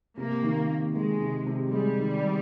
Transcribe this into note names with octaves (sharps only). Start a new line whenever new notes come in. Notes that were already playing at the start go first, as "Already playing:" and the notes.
C3 A#3
D#3
C3
D#3 G#3
C3
C3
G3 G#3
D#3
C3